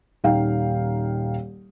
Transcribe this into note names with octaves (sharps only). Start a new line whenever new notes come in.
D#1 D#4 F5 G5